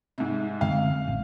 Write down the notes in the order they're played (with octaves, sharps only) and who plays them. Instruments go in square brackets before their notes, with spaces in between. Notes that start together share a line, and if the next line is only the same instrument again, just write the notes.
[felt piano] G#2 C3
[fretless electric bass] F#2 D3 G#3 [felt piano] F5
[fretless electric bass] A1